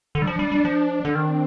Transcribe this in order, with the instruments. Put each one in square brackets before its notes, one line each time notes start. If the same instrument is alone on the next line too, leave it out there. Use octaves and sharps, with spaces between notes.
[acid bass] D3 [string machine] D4
[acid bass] G3
F3
G3
G3
F3
D3
[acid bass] D#3 [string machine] C4